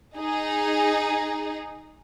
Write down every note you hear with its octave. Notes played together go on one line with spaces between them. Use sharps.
D#4 G#4